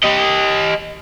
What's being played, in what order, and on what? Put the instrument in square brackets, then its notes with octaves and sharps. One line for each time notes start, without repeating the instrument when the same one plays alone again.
[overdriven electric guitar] G4 D#5